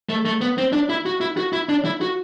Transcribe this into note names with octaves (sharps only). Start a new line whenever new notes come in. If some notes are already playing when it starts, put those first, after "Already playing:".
A3
A3
B3
C4
D4
E4
F#4
E4
F#4
E4
D4
E4
F#4